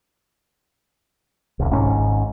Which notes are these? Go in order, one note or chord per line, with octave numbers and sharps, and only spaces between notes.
D1 C2
G#1 G#2 C#4